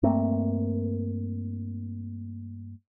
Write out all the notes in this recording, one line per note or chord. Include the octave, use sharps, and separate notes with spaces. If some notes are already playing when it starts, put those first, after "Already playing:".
G2 A3 A#3 C4